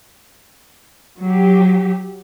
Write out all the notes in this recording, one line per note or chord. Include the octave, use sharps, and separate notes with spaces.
F#3 G4